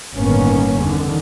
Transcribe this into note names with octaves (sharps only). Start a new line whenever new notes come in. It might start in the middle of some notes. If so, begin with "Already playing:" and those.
G1 A2 D#3 A#3 B3 C#4
E2 D3 D#3